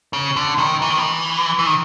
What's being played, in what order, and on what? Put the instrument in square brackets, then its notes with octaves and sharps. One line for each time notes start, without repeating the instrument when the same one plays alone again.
[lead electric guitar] C#3
D3
D#3
E3
D#3
E3
E3
D#3